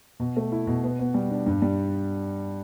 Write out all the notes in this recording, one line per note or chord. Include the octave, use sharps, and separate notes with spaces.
B2
A3
E4
B2
B3
B3
G3
D4
G2
G3